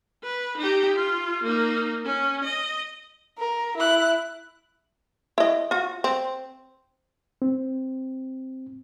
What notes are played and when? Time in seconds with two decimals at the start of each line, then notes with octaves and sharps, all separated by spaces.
0.23 B4
0.57 D#4 G4
0.95 F4
1.44 A#3 D#4
2.04 C#4
2.44 D#5
3.38 A#4
3.77 E4 F#6
5.38 E4 D#5
5.71 F4 F#4
6.04 C4
7.42 C4